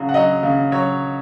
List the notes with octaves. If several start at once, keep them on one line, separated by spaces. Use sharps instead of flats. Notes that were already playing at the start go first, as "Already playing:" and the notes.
Already playing: C#3 F#3
F#5
F#3 D#5
C#3
F#3 C#5